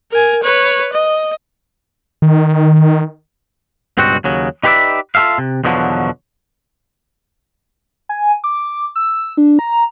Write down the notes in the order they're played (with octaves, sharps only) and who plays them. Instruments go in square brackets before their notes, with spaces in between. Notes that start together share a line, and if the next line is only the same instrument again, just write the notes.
[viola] A#4 G#5
B4 C#5
D#5
[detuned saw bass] D#3
[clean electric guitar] C#2 G2 B2 C4 F#4
D#2 C#3 F#3
D#4 G4 B4 C5 D5 E5
F4 F#4 A4 E5 F5
C3
E2 B2 D3 F3 F#3
[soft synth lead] G#5
D6
E6
D4
A#5